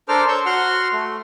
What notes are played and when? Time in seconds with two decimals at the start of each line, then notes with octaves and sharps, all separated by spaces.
0.08 D4 A4 A#4 C5 D6 F6
0.28 C5 C#5 C#6 E6 G6
0.46 F#4 F#5 C6 F6
0.93 A3